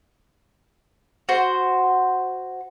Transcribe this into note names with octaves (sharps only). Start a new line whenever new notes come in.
F#4 C5